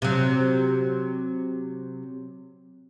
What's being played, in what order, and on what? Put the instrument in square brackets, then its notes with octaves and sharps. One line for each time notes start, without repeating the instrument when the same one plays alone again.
[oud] C3 F#3